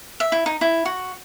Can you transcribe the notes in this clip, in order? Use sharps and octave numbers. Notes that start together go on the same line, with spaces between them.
E5
E4
D#4
E4
F#4